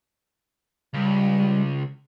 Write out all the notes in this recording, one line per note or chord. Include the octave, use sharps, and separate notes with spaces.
C#2 G3